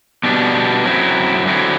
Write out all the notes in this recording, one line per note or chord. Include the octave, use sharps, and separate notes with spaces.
B2 G3 B3 D4
F#2 F#3 C4 E4
D3 F#3 C4 E4